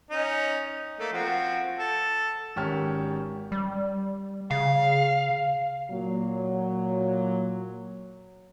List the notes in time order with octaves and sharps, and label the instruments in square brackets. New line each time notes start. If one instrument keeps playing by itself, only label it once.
[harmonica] C#4 D#4
A3 A#3
F3 C4 F#4
A4
[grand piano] G#1 C#4 G4 A#4 F6
[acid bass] G3
[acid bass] C#3 [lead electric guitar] F5
[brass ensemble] A#2 F#3